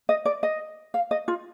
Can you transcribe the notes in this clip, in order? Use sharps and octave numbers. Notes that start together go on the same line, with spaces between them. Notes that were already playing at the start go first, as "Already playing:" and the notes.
D#5
D5
D#5
F5
D#5
F4